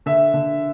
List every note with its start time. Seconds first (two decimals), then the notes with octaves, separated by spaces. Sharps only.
0.06 D3 E5
0.34 D3